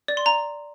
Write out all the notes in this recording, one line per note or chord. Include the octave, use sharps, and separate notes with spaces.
D5
C6
A#5